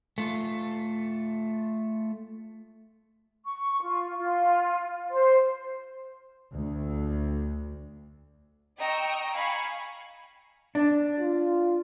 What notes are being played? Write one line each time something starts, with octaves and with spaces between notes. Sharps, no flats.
A3 F4
C#6
F4
F4
C5
D2
D#5 G5 A#5 C#6 E6
F5 G#5 B5 C#6
D4
F4